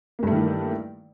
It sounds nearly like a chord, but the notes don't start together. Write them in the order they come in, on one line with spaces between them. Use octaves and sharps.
A#3 G2 A3 D#3 E3